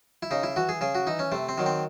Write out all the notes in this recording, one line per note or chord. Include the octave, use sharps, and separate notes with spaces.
E4
C#3 D#4
E4
E3 F#4
G#4
C#3 G#4
F#4
E3 D#4
C#4
C3 A3
C4
D#3 F#3
C4